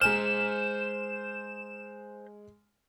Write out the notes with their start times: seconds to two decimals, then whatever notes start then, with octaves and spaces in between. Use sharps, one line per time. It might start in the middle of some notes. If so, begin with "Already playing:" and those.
0.01 G#3 C5 G#5 A#5 F6 E7